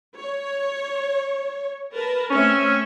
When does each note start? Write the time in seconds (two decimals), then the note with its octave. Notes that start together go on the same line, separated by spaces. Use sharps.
0.17 C#5
1.94 A#4 B4 A5
2.30 A3 C4 C#4 E5